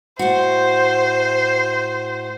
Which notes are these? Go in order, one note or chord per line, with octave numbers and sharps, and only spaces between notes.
A2 F#4 C5